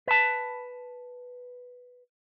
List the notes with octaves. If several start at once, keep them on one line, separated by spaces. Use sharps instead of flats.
B4 A5